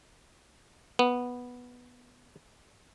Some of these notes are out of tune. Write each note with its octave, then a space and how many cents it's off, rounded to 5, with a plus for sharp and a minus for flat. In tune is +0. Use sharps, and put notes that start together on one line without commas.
B3 -5